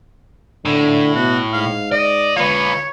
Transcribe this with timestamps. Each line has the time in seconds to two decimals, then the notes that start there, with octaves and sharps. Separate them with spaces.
0.65 A2 D3
1.15 B2 F#4
1.53 G#2 F5
1.92 D5 D#5
2.36 F4 B4 C#5